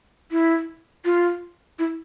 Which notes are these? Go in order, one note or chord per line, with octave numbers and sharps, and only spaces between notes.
E4
F4
E4